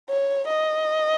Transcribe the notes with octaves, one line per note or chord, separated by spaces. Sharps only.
C#5
D#5